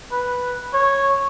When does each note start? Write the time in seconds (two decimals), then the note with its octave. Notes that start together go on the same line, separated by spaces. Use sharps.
0.12 B4
0.74 C#5